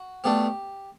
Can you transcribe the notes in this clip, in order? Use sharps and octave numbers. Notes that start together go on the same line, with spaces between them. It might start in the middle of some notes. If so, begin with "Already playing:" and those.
Already playing: F#4
B2 A3 D4 G4